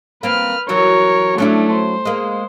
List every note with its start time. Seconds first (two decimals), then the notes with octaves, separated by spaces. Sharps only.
0.23 A#3 C4 B4 F6
0.69 E3 F#3 F#4 A#4 C#5
1.38 F#3 A3 C#4 D4 E4
1.72 C5
2.05 G#3 A#3